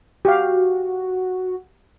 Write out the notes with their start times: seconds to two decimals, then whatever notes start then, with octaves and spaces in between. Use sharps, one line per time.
0.25 F#4 G4 F5